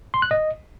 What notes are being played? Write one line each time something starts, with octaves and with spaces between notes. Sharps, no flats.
C6
F#6
D#5